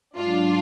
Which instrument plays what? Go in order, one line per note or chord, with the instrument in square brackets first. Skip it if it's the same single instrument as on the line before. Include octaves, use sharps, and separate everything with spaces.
[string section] G#2 F#3 D4 F4